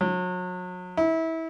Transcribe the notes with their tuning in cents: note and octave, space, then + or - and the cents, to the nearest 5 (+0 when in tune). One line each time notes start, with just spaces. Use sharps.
F#3 -35
E4 -25